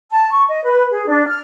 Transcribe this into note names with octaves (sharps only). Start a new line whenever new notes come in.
A5
C#6
D#5
B4
G#4
D4
F6